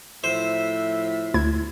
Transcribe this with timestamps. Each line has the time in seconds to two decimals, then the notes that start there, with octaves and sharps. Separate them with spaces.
0.24 A2 F3 C5 E5
1.34 D2 E4 G#6